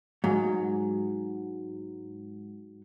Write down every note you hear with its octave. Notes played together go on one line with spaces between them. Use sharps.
G#2 F#3